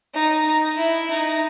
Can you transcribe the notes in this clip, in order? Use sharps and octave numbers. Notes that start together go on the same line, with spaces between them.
D#4
D#4
E4
D#4